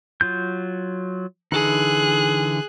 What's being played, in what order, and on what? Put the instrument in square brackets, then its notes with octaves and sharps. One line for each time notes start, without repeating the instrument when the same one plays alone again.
[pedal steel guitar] F#3 F4 G6
[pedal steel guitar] D3 E3 D#4 [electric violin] G#4 F#6